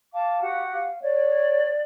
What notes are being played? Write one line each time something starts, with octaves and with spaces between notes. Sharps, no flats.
F5 A5 D6
F#4 G4 F#5
F5
C#5 D5